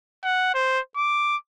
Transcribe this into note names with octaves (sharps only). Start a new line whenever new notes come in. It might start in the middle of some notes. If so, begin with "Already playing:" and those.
F#5
C5
D6